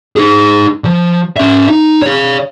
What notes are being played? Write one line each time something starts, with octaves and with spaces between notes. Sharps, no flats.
D#4 G#4
F3
C#4 E5
D#4
C#5 F5